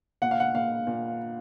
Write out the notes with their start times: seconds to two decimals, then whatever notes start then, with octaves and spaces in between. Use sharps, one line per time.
0.22 A#2 F#5
0.31 F5
0.40 F#5
0.54 A#2 F5
0.87 A#2